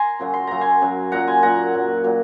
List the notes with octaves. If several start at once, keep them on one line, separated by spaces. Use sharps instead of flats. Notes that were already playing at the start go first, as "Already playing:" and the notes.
Already playing: G#5 A#5 C6
F#2 C#3 F#3
C6
F#2 C#3 F#3 A#5
G#5 C6
F#2 C#3 F#3
A#2 F#3 F#5 A#5
G#5 C6
A#2 F#3 F#5 A#5
A#2 F#3
A#2 F#3